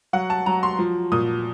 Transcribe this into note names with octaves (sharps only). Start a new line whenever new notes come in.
F#3 F#5
A5
F#3 A#5
C6
F3
A#2 D#6